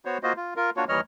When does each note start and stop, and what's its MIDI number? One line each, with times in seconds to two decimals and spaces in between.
0.05 0.18 59
0.05 0.18 66
0.05 0.18 72
0.05 0.18 73
0.23 0.33 58
0.23 0.33 65
0.23 0.33 66
0.23 0.33 72
0.23 0.33 75
0.37 0.54 65
0.56 0.70 65
0.56 0.70 70
0.77 0.85 58
0.77 0.85 62
0.77 0.85 65
0.77 0.85 66
0.77 0.85 73
0.89 1.01 39
0.89 1.01 52
0.89 1.01 55
0.89 1.01 73
0.89 1.01 75
0.89 1.01 89